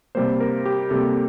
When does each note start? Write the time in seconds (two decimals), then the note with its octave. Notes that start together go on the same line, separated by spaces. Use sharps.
0.15 C3 G3 A#3 C5
0.40 A#4
0.66 G4
0.90 C3 G3 A#3 A4